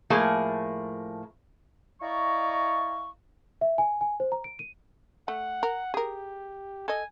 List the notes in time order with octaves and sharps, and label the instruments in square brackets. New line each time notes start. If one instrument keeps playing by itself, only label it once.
[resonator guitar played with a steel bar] A2 F3 A3 A#3 G#4
[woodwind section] E4 D5 D#5 F5 A#5 C#6
[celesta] E5
G#5
G#5
C5
A#5
D7
D#7
[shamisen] A3 [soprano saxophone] F#5
[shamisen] A#4
[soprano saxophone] G4 [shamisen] G#4 A#4
[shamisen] A4 D#5 [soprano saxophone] G#5